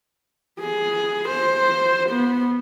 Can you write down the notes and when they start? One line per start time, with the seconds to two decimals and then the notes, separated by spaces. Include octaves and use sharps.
0.60 G#4
1.29 C5
2.10 B3